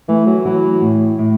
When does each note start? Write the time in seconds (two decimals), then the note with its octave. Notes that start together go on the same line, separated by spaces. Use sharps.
0.09 E3 A3
0.27 F#3
0.45 E3 F#3
0.81 A2
1.18 A2